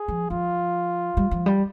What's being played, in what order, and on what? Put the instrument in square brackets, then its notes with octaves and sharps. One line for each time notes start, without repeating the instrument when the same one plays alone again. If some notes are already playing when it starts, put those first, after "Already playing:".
Already playing: [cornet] G#4
[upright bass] F3
[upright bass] F3 [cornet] F4
[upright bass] G3
F3
G3